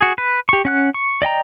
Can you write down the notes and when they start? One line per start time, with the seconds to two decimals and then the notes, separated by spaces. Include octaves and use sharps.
0.01 F#4 G#4
0.18 B4
0.49 G4 C#6
0.65 C#4 F#5 F#6
0.94 C#6
1.22 D5 D#5 G5 A#5